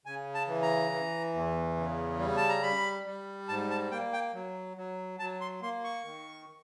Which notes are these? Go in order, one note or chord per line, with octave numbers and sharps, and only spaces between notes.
C#3 G#5
A5
E3
A#5
E3
E2
C#3
G3
A5
A#5
G3 B5
G3
G#2 A5
A5
A#3 G5
G5
F#3
F#3
F#3 A5
C6
A#3 C6
C#6
D#3